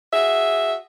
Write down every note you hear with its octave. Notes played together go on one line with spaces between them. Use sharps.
F#4 G#4 E5